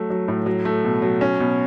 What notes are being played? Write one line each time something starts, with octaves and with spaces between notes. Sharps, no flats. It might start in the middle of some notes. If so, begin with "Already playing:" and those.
Already playing: F#3 A3
F#3
A2
F#3
A3
B2
F#3
C#4
B2